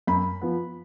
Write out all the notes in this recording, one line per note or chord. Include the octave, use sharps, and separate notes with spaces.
F#2 B5
F3 B3